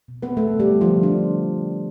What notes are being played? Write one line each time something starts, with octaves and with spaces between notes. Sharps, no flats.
B2
B3 C4 B4
A3 C4 A4
D3
G3 G4
D3
D3 F3 F4
D3
D4
A3